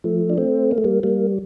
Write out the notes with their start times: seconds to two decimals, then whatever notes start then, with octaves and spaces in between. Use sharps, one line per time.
0.04 F3 A3
0.30 D4
0.38 A3 C4
0.71 A#3
0.78 A3
0.84 G3 A#3
1.03 G3 A#3